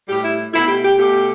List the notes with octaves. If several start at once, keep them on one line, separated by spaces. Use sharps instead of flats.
A2 G3 G4
E4
B2 A3 E4
G4
G4
B2 A3 G4